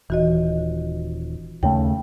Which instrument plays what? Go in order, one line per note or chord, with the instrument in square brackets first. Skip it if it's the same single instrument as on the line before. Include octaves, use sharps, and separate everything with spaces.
[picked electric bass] D#1 [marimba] E3 F#4 D#5
[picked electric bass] D#2 C#3 A3 [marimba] G5